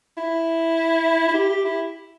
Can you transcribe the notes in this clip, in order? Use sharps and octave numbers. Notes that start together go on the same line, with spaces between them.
E4
E4
G4
G4
E4